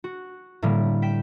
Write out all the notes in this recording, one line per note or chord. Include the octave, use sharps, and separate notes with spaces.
F#4
A2 D3 G3 A#3
G5 B6 E7